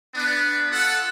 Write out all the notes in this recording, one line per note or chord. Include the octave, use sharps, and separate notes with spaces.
B3 D4
F4 A4 F#5